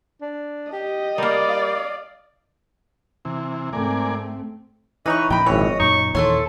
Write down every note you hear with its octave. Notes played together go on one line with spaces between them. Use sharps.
D4
G4 D#5
G3 A#3 A#4 D5
F5
C3 E3
G#2 A3 C4 A#4 D5 G#5
E3 D#4 B4 C#5 D#5 C#6
A#2 F3 G5 B5
G#1 E3 C#5
F#2 A#2 D#4 C#6
D#2 A#2 E3 A3 A4 C#5 C6